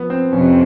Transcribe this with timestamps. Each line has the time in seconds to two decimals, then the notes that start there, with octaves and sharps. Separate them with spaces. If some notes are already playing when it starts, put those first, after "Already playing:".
Already playing: F3 B3
0.10 C4
0.32 F2 C3 C#4